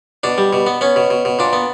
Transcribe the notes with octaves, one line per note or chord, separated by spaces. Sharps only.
B2 D4
G3
B2
B3
B3 C#4
B2
B2
B2
A#2 D4
B3